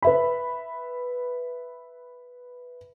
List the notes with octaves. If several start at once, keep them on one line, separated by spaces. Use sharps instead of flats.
B4 E5 B5